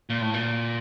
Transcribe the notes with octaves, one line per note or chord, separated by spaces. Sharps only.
A#2
A2
A#2